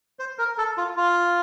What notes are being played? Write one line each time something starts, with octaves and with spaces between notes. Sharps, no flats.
C5
A#4
A4
F4
F4